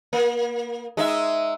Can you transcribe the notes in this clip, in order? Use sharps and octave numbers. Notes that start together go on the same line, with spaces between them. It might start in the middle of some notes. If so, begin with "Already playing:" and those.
A#3
G#3 D#4 E5